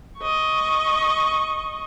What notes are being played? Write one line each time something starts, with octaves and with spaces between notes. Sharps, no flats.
D#5 C#6